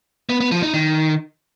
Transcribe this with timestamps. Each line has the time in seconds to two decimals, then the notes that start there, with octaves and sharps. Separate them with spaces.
0.29 B3
0.40 B3
0.52 F3
0.63 D#4
0.74 D#3